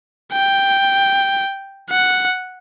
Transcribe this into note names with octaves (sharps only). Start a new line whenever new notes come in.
G5
F#5